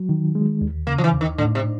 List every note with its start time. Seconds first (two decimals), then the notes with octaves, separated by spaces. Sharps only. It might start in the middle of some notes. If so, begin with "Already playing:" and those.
Already playing: F#3
0.09 D#3
0.35 G#3
0.61 D#2
0.87 C#3 A#3
0.98 F3
1.04 E3
1.12 D#2
1.21 D#3
1.38 A2 D3
1.55 C3
1.64 A2